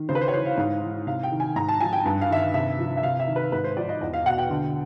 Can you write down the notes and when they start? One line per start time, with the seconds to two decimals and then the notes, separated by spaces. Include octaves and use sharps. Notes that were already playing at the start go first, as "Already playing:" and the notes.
Already playing: D#3
0.09 C#3 C5
0.15 B4
0.21 C5
0.28 C#5
0.33 E3 C5
0.46 F5
0.58 G#2 F5
0.82 E3
1.07 C3 F5
1.23 G5
1.32 D#3
1.40 G#5
1.56 G#2 A#5
1.69 A5
1.80 F3 G#5
1.93 G5
2.05 G2
2.21 F5
2.30 D#3 E5
2.37 F5
2.54 C3 E5
2.79 F3
2.97 E5
3.03 C3 F5
3.20 E5
3.27 D#3
3.36 B4
3.52 G#2 B4
3.64 C5
3.76 F3 D5
3.89 D#5
4.01 E2 D#5
4.13 F5
4.26 B2 F#5
4.38 G5
4.50 D3